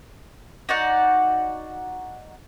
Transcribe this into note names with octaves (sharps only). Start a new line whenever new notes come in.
D#4 F#4 D5 F#5